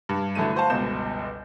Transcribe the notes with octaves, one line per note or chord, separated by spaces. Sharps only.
G2
D3 E3 F#3 A3 D#7
F#4 C5 F5 A5
G1 C#2 B2 G6 E7